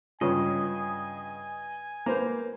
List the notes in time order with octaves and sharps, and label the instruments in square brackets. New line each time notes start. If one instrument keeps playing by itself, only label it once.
[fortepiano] G2 C#3 [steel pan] F4 C#5 [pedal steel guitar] D#5 [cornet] G#5
[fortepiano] A#3 [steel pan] B4 C5 A#5